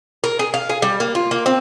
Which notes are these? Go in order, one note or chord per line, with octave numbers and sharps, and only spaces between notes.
A#4
G#4
F5
G#4
G3
A#3
F4
A#3
C4